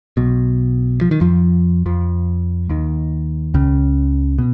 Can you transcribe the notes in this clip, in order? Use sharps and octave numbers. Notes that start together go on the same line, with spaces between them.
B1 B2
F3
D#3
F2 F3
F2 F3
D#2 D#3
C#2 C#3
B2